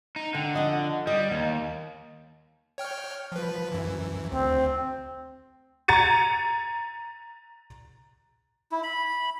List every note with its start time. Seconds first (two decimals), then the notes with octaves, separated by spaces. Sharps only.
0.16 D#4
0.35 D3 G5
0.54 F2 D#5 F#5
1.07 G3 D#5
1.31 D#2
2.78 C#5 G5 F6
3.32 F3 B4
3.72 F#2 E3
4.32 D2 C4
5.88 A#5 G#6 A6 C#7 D#7
8.72 E4
8.83 B5